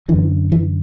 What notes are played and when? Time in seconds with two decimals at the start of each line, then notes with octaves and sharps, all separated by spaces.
0.08 F#2 D3 E3
0.52 E3